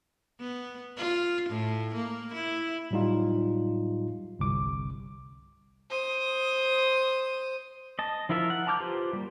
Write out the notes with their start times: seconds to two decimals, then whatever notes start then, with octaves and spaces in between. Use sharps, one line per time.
0.40 B3
0.97 F4
1.49 A2
1.95 A#3
2.34 E4
2.91 A2 F#3 G3 D#4 F4
4.39 G1 C2 D6
5.90 C5 D#6
7.99 D#5 A5
8.29 F3 E4 F4 A#4 E5
8.50 F#5
8.67 A5 A#5 D6 F6 G6
8.80 F4 G4 B4 C5
9.13 G3 A#3